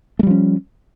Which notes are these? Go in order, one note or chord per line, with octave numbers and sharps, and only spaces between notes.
F3 G3 A3 C#4